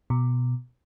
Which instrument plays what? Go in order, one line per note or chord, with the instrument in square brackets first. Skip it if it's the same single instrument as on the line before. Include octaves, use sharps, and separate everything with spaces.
[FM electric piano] B2